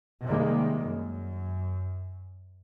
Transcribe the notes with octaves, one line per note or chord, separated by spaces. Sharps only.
C3 D#3 G3 G#3 A#3
F#2